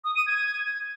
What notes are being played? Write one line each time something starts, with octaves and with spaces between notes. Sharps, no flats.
D#6
D#7
G#6